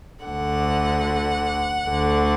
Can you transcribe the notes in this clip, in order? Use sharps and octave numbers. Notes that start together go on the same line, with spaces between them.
D2 D3 F#5
D2 D3